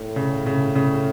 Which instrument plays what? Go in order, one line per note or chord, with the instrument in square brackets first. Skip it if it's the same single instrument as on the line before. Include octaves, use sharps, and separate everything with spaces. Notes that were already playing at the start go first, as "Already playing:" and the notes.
Already playing: [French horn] A2
[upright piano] C#3
C#3
C#3